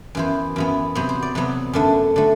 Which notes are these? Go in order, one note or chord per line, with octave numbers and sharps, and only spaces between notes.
F#2 E3 B3 C5
F#2 E3 B3
C3 F#3 B3 C5
C5
D5
C3 F#3 B3 B4
F#2 D3 A3
D3 A3